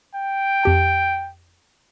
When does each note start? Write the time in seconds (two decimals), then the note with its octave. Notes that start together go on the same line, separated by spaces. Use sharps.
0.15 G5
0.63 F2 G4 A5